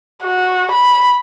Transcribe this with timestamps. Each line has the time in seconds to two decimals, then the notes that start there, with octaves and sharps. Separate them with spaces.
0.24 F#4
0.72 B5